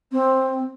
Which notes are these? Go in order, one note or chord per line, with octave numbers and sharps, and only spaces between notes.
C4